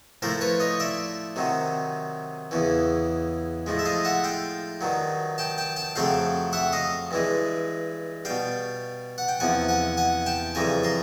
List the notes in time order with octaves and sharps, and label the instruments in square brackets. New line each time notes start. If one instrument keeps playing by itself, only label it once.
[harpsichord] A2 F3 A3 A#4 C5
B4 C#5
C#5 D#5
D5 E5
C3 D#3 F#3
E2 C#3 E3
A2 F3 G#3
E5
D#5 F5
E5 F#5
F5 G5
G2 D#3 F#3
G5 A5
G5 A5
G5 A5
F2 C#3 F#3 A3 F5 G5
E5 F#5
D#5 F5
G2 E3 G#3
B2 G3 F5 G5
F#5
G5
E2 C3 F3 F#5 G#5
F#5 G#5
F#5 G#5
G5 A5
F2 C#3 E3 G3 G#5 A#5
A#5 C6